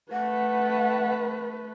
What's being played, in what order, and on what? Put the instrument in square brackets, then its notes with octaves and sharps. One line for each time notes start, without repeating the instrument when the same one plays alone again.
[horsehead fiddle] A3 B4 [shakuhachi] F#5